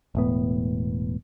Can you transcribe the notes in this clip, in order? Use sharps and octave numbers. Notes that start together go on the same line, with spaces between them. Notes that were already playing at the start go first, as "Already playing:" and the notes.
E1 A2 B3